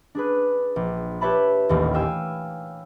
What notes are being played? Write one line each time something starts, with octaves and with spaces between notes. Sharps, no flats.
D4 G#4 B4
A#1
G4 B4 C#5 E5 A5 B5
D#1 A1 D#2
F5 G5 G#5 E6